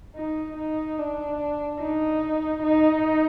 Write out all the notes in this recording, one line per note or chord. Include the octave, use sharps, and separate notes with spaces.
D#4
D#4
D4
D#4
D#4